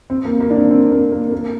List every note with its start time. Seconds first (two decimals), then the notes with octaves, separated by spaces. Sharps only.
0.10 C4
0.25 A#3
0.40 A#3
0.50 D4
0.56 C4
0.71 C4
0.92 A#3
1.12 A#3
1.32 A#3